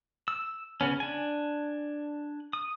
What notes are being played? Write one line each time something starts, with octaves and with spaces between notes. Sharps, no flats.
E6
C#3 B3 C#4
D4 G#5
D#6